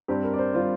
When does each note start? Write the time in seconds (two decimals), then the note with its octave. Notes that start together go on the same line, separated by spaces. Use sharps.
0.08 G2 G3 C4 G4
0.24 A#4
0.34 D5
0.38 C5
0.54 G3 C4 F4